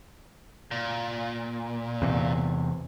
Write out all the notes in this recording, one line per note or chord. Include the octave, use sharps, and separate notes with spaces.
A#2
E2 C3